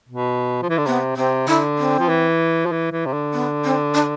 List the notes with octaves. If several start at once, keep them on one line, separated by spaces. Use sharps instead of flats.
B2
F3
E3
D3
C3 B3
C3 C4
D3 E4
C4
F3
E3
F3
E3
E3
C3
D3
B3
C4
D4